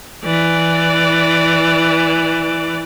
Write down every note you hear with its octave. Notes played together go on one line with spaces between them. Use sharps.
E3 D5